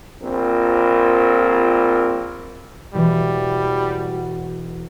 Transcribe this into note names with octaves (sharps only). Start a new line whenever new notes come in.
A#1 C4 F4 A#4
E1 E3 G3 F#4